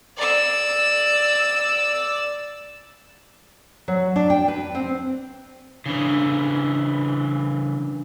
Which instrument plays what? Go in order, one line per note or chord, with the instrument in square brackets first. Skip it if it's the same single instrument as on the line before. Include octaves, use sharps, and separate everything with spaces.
[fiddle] D5 E6
[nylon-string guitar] F#3
D4
G5
B4
C4
[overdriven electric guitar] C#3 E3 [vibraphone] D4